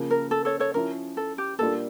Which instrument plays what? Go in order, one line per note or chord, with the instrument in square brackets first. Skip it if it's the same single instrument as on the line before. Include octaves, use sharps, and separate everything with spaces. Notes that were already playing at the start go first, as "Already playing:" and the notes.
Already playing: [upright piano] C#3 F3 A#3
[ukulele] A#4
A4
A4 C#5
A4 C#5
[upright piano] F3 C#4 E4 [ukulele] A#4
[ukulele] A4
G4
[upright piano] A#2 G3 A#3 D4 F4 [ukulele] A4